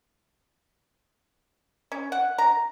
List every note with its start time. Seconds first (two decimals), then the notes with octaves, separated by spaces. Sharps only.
1.92 C#4
2.12 F#5
2.38 A#5